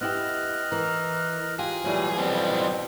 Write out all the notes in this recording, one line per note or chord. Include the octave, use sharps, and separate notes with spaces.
B3 E4 G4 D#5 F6 F#6
E3 A#4
F4 G4 G#4
A#2 E3 F#3 G3 A3
F2 B2 F3 G3 C4